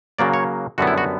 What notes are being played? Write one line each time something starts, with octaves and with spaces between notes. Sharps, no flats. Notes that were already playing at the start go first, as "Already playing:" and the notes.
C#3 F#3 A#3 D5
C#5
F#2 D3 G3 B3 F#4
E4
F#4